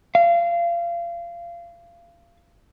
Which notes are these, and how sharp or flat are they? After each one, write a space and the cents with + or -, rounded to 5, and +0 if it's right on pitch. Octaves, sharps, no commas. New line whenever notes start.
F5 -25